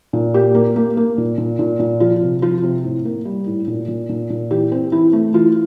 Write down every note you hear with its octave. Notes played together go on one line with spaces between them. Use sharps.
A#2
A#3 G4
A#3
A#3
A#3
A#2
A#2
A#2
A#2
F3 F4
C3
F3 F4
C3
A2
A#3
G3
A2
A#2
A#2
A#2
A#2
E3 G4
C4
E3 E4
A3
E3 F4